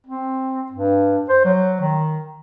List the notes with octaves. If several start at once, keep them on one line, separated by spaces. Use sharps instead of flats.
C4
G2
C5
F#3
D#3